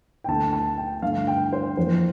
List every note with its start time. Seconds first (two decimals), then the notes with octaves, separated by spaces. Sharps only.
0.24 G5
0.28 D2 D3 A3 A5
0.53 A5
0.78 G5
1.02 G2 D3 A3 F5
1.27 G5
1.53 C5
1.77 F2 E3 A#3 C5